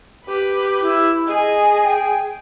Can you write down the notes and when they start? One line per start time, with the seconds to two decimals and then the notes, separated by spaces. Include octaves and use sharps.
0.25 G4 B4
0.81 E4
1.27 G#4 D#5 G#5
1.83 G5